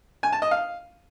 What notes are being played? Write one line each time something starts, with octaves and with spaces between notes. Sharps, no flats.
G#5
A5
D#5
F5